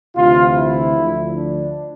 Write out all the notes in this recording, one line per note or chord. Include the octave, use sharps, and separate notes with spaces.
D2 C3 E3 F4
E4
D2 D3 F3
D4